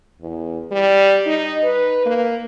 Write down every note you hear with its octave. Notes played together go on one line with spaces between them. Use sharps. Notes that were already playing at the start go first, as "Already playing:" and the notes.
E2
G3
D#4
B4
A#3